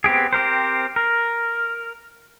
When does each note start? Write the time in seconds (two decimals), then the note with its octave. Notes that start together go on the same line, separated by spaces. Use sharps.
0.04 B3 C4 G4 G#4
0.33 C4 G4 A#4 C5
0.96 A#4